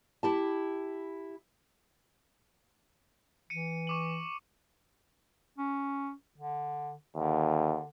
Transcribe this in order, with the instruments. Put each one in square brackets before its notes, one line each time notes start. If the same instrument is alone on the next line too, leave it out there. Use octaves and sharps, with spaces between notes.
[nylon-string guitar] E4 G4 A5
[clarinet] E3 [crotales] C#7 D#7
[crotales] C#6 D6 F#7
[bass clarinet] C#4
D3
[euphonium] D#2 [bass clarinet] D3